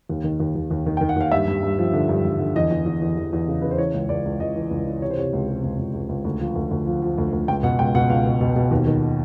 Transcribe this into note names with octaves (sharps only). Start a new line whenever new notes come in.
D#2
D#3
D#2
D#2
D#2
D#3
D#3 G5
F#5
D#2 F5
G2 E5
G2
G2
F3
D3
G2
G2
D3
E2 D#5
E2
E2
E2
E2
E2
C#3
C#3 B4
C5
E3 C#5
C#2
C#2 D5
C#2
C#2 D#5
E3
C#2
E3
C3 C#5
C5
C3 C#5
C#2
C3
C#2
C#2
C#2
C#2
D2
F3
D2
D2
F3
F3
D2
D2
C#2 G5
B2 F#5
C#2 G5
B2 F#5
C#2 F5
B2
B2
B2
D#2
D#3